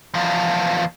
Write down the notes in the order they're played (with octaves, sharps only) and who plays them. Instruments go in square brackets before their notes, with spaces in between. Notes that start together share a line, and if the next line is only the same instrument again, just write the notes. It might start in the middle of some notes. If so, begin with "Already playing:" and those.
[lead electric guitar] E2 F3